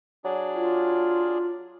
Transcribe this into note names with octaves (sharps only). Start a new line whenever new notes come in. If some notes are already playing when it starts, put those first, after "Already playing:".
F#3 D4 G#4 D5
F4